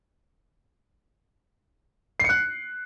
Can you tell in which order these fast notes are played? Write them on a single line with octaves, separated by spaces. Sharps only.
C7 C#7 F#6